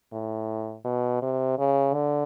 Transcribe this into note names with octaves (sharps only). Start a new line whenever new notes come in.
A2
B2
C3
C#3
D3